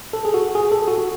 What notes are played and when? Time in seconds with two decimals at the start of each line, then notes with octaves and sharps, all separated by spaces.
0.13 A4
0.25 G#4
0.34 F#4
0.55 G#4
0.72 A4
0.88 F#4
0.98 F#4